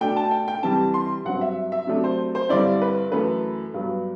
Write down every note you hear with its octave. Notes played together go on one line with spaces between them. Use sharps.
B2 A3 D4 G5
A5
G5
G5
C3 E3 G3 A5
C6
G2 F#3 C4 F#5
E5
E5
C3 F#3 A3 D4
C5
C5
G2 D3 G3 C4 E4 D5
B4
F#2 E3 A3 B4
G2 F#3 B3